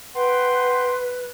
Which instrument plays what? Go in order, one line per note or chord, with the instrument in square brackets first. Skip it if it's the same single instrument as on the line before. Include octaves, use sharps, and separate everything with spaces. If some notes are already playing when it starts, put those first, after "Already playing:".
[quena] B4 [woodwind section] F#5 G5 C6